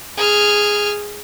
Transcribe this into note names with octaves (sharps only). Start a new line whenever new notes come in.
G#4 F6